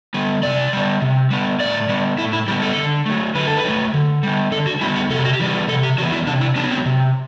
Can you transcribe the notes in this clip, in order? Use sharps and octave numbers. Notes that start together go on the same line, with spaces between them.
G3 B3
C3 D5
G3 B3
C3
G3 B3
A2 D5
G3 B3
A2 E4
E4
G3 B3 G4
A4
D3
F#3 A3
D3 B4
A4
B4
F#3 A3
D3
G3 B3
D3 A4
F#4
G3 B3 E4
F#4
C3 A4
G4
F#4
G4
E3 G3 B3
C3 A4
G4
E3 G3 B3 F#4
E4
C3 D4
E4
F#3 B3 D4
C4
C3